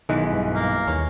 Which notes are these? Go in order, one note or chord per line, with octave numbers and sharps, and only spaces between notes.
B1 D#3 E3 G#3 B4
G2
A#3
D#2 C#4